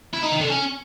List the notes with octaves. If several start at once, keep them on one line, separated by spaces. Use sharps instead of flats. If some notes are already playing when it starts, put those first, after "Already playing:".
E4
D#4
D#3
D3
C#4